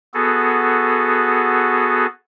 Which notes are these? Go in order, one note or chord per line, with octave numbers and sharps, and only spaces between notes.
B3 F#4 G#4 A4